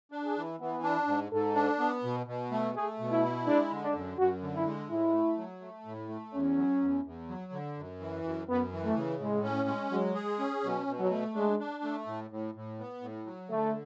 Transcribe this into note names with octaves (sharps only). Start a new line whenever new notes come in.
D4
G#4
E3
E3 B3
D4
G#2
G#2 A4
D4
B3
B2
B2
A3
A3 G#4
B2
E4
E4
G#3 D4
D3
D4
F#2
F#2 F#4
D3
E4
G#3
A2 E4
A3
F#3
A3
A2
A3
E2 C#4
F#3
E2
E2
F#3
D3
F#2
E3
F#2
F#2 B3
E3
A3
C#3
A2 G#3
C#4
G#3
F#3 G#3
G#4
C#4
B2 F#3
B2
F#3
A3
G#3 D4
D4
A3
A2
A2
A2
B3
A2
F#3
D3 A3